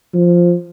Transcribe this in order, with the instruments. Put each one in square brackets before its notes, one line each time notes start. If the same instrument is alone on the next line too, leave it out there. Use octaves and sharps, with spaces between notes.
[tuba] F3